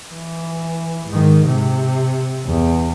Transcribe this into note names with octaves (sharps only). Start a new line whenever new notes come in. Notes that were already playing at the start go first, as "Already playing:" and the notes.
E3
G#2 D#3
C3
E2